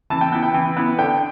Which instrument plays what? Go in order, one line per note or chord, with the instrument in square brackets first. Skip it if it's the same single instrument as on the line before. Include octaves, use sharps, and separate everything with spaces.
[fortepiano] E3 A5
G5
B3 E4 G5
G5
E3
B3 E4
D3 G5